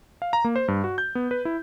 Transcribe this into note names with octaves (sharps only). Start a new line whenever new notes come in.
F5
A#5
A#3
C5
G2
F#4
G6
B3
B4
E4